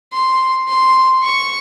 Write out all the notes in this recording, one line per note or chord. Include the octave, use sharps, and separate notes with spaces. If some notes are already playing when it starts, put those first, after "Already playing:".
C6
C6
C#6